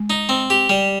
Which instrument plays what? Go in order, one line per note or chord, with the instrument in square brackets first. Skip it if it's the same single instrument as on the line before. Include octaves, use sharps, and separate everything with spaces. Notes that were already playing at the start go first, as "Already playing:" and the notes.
Already playing: [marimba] G#3
[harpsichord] D#4
C4
G4
G3